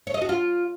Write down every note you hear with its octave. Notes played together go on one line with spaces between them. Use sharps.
C#5
D#5
F#4
F4